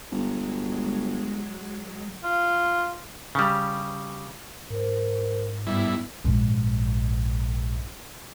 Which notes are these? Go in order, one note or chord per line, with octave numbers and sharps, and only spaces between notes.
G1 F#3 G#3
F4
C#3 G3
G#2 A#4 C5
G2 B3 E4
A#1 G#2